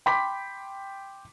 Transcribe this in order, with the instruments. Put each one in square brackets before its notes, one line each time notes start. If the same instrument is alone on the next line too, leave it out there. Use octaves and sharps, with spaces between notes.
[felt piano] G5 B5 C6 D6 B6